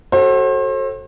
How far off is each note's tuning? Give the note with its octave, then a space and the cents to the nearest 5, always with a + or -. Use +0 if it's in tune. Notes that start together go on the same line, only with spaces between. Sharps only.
F#4 +30 A4 +0 C5 +40